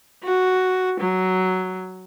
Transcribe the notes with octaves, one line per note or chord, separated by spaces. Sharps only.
F#4
F#3